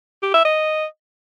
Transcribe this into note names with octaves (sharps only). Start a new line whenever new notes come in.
G4
E5
D#5